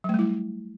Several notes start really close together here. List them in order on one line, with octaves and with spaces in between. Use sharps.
F#3 A3 G3 E4